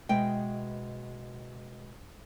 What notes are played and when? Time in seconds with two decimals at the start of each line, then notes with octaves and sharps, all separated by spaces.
0.09 B2 G#3 E5 G5